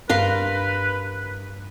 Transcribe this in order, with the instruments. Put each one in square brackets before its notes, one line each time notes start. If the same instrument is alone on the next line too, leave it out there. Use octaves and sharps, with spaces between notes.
[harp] G2 [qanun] A#4 F5 C6 [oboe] B4